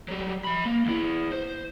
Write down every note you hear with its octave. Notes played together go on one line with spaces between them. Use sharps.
F#3 G3
F3 B5
A#3
E2 E4
C5